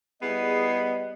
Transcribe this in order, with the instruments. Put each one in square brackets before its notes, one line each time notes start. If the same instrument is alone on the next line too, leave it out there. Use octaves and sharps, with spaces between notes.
[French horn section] G3 D#5 [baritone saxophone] B3 [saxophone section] E4 G#4 [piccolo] C7